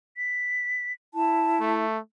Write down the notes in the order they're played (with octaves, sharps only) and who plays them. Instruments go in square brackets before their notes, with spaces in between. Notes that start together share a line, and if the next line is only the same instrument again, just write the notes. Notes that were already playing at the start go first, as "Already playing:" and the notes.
[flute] B6
[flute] E4 [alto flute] A5
[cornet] A3